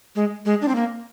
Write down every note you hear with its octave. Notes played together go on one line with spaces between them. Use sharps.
G#3
G#3
D4
C4
A#3